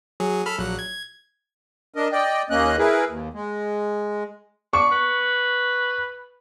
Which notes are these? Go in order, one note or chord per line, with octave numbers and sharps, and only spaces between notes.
F#3 G#4
A4 B5 F6
A#1 F#3 F#6
G#6
D4 A#4 D#5
D5 D#5 G5
D#2 A#3 C#4 D#5 F#6
E4 G#4 A#4 B4
D#2
G#3
D4 C#6
B4